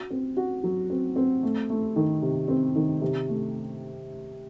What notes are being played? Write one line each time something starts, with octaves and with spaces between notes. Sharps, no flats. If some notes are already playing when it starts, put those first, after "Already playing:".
Already playing: F#4
C4
F#4
F#3
C4
C4
A3
A3
D#3
C3
C4
D#3
C3
A3